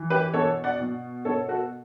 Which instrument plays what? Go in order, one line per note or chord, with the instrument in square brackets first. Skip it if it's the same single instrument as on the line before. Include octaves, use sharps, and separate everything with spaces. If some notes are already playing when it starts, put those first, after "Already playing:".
Already playing: [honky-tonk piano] E3
G4 B4
B2 A4 C#5
D5 F#5
B2
B2 A4 C#5
F#4 A4